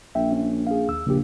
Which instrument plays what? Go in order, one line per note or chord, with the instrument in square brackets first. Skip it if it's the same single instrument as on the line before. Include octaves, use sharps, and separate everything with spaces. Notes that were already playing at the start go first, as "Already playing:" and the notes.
[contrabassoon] A#1 [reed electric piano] E5 G5
[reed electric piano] C#4
G#4 F5
D#2 E6
[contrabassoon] A#1 [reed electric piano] C#3 G4